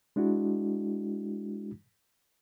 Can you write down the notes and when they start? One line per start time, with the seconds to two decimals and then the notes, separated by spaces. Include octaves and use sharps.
0.16 G#3 D4 E4 F#4